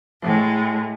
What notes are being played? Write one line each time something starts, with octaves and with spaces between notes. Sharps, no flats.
A2 G#3